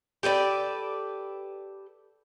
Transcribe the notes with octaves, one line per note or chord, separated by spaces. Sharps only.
G4 A4 B4 D5